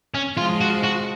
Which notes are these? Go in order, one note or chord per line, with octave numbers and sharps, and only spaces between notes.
C#4
F3 G#3 F4
F#4
F#4